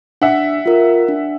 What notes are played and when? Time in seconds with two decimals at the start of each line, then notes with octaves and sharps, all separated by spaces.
0.22 D4 E5 F#5
0.66 F4 A#4
1.08 D4